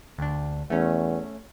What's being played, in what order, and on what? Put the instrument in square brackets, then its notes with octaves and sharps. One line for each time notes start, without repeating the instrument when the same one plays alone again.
[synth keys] D2 D4
[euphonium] E2 [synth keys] A3 C#4